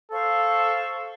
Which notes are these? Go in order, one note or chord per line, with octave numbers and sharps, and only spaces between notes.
A4 C5 F5 C#6